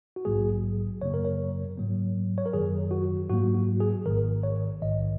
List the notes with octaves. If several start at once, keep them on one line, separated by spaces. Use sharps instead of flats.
F#4
A#1 G#2 F#3 A#3 G#4
F#2 C#3 F#3 A#3 C#5
A#4
C#5
G#2 F#3 A#3
C#5
A#4
F#2 D#3 F#3 G#4
F#4
G#2 F#3 A#3 F#4
F#4
G#4
G#1 G#2 D#3 A#4
C#5
A#1 G#2 D#3 D#5